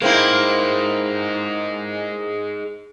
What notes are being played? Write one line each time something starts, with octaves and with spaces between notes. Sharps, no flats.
G#3 A#3 C4 D#4 E4